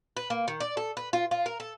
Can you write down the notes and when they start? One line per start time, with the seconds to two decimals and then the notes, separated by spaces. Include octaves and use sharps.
0.17 B4
0.30 A#3
0.48 D#3
0.60 D5
0.77 A4
0.97 B4
1.13 F4
1.31 F4
1.46 A#4
1.60 A4